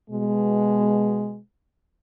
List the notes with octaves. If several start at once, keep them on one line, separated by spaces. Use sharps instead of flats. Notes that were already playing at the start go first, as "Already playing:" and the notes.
B2 G#3